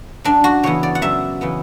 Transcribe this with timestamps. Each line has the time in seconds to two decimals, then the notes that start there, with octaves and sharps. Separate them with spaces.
0.24 F#2 D4
0.44 F#4
0.63 C#3 E3 B3 C#5
0.83 D5
0.95 F#5
1.02 F#2 E5
1.41 C#3 E3 B3